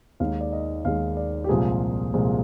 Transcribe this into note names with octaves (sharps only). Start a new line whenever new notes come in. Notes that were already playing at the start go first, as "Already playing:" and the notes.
D#2 D#3 G#3 F5
D5
D#5
D#2 D#3 G#3 F5
D5
G4
C2 A#2 F3 G#3 G#4
C2 A#2 F3 G#3